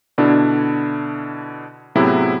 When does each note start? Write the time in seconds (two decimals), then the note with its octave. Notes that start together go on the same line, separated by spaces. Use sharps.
0.18 B2 D3 D4 E4
1.95 A2 C3 F#3 B3 E4 G#4